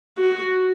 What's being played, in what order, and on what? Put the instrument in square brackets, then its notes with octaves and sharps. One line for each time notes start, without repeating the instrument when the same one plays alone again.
[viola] F#4